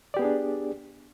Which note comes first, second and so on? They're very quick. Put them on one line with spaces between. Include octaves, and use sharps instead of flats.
D5 G4 B3 G#4 D4